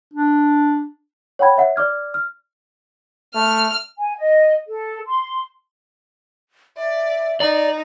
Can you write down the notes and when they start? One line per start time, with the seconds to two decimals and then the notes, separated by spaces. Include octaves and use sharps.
0.14 D4
1.39 C#5 F#5 G5 B5 G#6
1.57 C#5 E5 F#5
1.76 D5 D6 F6 G#6
2.14 F6
3.35 A3 F6
3.97 G#5
4.17 D#5
4.67 A4
5.05 C6
6.77 D5 E5
7.40 D#4 D5 A#5